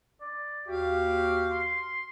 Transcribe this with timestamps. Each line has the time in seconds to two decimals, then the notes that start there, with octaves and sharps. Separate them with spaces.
0.21 D5
0.67 D#2 F#4 G4 F5
1.51 C6